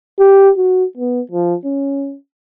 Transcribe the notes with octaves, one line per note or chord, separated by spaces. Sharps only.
G4
F#4
B3
F3
C#4